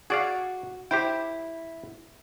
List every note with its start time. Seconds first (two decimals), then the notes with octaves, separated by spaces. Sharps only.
0.10 F#4 G#4 D5 F5
0.91 E4 G4 C5 G5